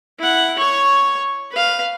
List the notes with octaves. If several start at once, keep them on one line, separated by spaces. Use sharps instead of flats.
E4 F#5
C#5 C#6
B4 F5